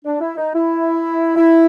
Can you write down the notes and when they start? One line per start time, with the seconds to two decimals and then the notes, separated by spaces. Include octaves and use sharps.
0.05 D4
0.21 E4
0.38 D#4
0.54 E4
1.36 E4